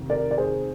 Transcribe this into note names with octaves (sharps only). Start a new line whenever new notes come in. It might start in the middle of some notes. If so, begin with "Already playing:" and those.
Already playing: F1 D#2
A#4 D5
D5
G#4 C5